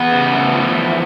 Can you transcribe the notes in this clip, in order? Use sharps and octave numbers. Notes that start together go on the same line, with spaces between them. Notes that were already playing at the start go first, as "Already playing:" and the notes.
Already playing: E2 B3
C#3
A3
F3
E2